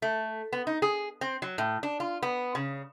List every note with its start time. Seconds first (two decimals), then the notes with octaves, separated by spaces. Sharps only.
0.02 A3
0.53 B3
0.67 D#4
0.82 G#4
1.21 C4
1.42 F#3
1.58 A2
1.83 D4
2.00 F4
2.22 B3
2.55 C#3